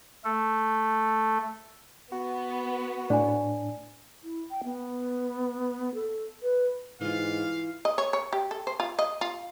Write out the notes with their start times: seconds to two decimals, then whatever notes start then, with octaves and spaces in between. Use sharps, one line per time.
0.24 A3 A4
2.12 B3 F#4
3.10 A2 D4 D5 G#5
4.24 E4
4.51 G5
4.64 B3
5.95 A4
6.43 B4
7.01 G#2 E3 F4 F5
7.85 D#5
7.98 C#5
8.13 C#5
8.33 G4
8.51 A4
8.67 C5
8.80 F4
8.99 D#5
9.21 F4